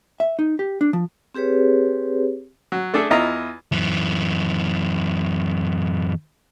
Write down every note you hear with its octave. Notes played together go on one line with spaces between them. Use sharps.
E5
D#4
G4
D4
F3
C4 G4 G#4 B4 C#5
F#3
A3 D4 G#4 A4
E2 E4 F4 D#5 A#5
F#2 E3